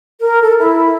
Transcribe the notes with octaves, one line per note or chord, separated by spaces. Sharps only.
A#4
A4
E4